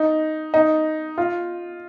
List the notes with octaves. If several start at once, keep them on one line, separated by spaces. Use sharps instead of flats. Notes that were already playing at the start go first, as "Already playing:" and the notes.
Already playing: D#4
D#4
F4